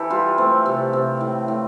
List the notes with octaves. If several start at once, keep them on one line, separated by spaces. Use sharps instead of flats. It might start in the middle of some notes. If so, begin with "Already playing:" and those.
Already playing: E3 G4 A4
G3 F4
A3 C4
C3
C3
A2
A2